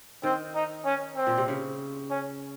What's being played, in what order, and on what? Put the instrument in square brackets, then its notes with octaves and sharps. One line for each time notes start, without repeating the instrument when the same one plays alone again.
[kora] D#3 [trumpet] C4
[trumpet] D#4
C#4
C4
[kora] A#2
C3
C#3
[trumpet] C#4